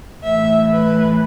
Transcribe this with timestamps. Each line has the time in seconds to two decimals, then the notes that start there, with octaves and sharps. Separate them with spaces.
0.23 A2 E3 E5
0.72 B4